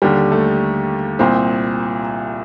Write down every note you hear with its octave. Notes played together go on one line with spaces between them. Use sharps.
D#2 D3 G3
A3
C2 A#2 C4